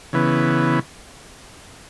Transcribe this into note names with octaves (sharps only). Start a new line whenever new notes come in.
C#3 E3 B3